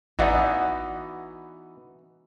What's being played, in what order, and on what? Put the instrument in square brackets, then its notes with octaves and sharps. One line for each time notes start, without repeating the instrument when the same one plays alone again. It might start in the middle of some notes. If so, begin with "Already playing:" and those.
[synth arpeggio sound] A1 D5 E5 [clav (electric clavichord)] E3 B3 D#4 [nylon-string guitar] F#4